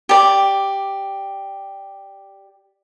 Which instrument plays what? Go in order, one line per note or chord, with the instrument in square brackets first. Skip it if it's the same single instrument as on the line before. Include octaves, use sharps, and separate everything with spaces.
[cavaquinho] G4 D5